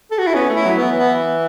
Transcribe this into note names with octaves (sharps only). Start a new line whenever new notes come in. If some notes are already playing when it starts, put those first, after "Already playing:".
A4
F#4
E4
B3 C#4
A3
E4
F#3
B3
E3
B3